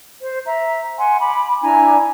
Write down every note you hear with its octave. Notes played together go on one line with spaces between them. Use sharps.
C5
E5 A#5
F#5 G#5 C6
B5 D6
D4 E4 G#5 A#5